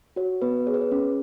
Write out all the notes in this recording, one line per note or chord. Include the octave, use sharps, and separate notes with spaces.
F#4 C#5
B3 B4
G#4 C#5
B4
C#5
C#4